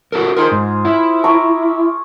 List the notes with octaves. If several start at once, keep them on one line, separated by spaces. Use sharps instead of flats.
F#4 A4 A#4
D#4 F4 G#4 A#4 C5
G#2
E4
A#5 C#6 D6